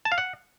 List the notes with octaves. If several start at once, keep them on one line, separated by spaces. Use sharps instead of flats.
A5
F5
F#5